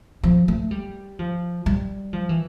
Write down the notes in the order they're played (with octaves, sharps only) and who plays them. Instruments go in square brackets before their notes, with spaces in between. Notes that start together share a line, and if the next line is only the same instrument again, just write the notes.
[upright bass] F3
A3
G3
F3
G3
F3
E3